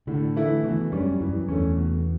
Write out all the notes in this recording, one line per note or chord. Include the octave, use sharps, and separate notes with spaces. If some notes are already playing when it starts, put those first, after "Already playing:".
A2 D3
E3 A3 E4
B2 E3
F#2 G3 C#4
F#2 E3
E2 A3 C#4
B2